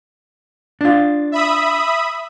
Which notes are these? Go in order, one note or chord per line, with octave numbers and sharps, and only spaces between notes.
D4 F4
E5 B5 D#6